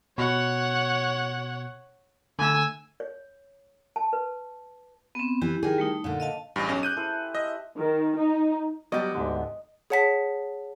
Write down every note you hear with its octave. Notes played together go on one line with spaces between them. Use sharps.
B2 C#5 F#5
D3 A3 G#5 E6
C#5
A5
B4
B3 C4
E3 G4
D#3 G#4
G3 A3 D#4
A#2 D3
D#5 F5 A5
A1 G2 G4 G#4
B1 C#4
F#6 G6 D#7
E4 A4 C5
D#5 E5
D#3
D#4
F#3 G3 B3 G4 D#5
D2 G#2 D3
G#4 C#5 F#5 A5 B6